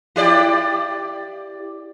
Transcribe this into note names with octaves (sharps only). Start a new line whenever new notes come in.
E4 G4 D5